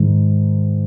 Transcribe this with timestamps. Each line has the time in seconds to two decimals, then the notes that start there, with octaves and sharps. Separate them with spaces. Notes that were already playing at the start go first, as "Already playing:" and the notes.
Already playing: G#2 D#3